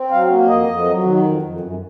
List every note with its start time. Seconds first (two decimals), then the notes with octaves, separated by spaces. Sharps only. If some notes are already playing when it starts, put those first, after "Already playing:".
Already playing: C4
0.11 F#3 F5
0.30 A#3
0.48 F2 D#5
0.67 F2
0.85 F#3
1.04 D#3
1.23 F2
1.42 F2
1.60 F#2